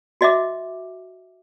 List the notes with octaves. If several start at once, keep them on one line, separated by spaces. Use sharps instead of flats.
F#4 D#5 E5 D6